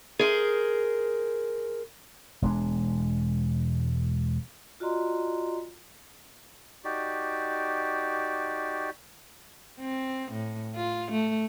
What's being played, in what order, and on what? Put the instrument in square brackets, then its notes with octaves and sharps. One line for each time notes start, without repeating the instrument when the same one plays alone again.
[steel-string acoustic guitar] G#4 A#4 C5
[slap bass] E1 G#3 D4
[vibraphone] F4 F#4 D5 D#5 A#5 C6
[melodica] D#4 F#4 G4 D5
[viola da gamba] C4
A2
F4
A3